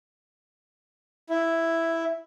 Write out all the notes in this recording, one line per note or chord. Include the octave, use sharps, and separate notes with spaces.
E4